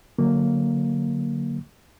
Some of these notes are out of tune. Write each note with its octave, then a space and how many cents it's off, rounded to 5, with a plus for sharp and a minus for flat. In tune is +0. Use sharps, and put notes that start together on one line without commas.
D3 +0 F#3 +0 A#3 +0